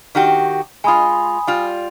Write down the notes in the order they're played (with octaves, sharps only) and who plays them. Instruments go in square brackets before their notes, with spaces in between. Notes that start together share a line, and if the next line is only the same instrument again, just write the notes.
[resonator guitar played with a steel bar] D#3 F#4 G4
[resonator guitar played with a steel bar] G#3 F4 [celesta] G#5 B5 D#6
[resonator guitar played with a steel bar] G3 F4